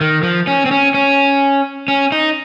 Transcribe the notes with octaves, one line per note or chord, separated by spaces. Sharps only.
D#3
F3
C#4
C4
C#4
C#4
C#4
D#4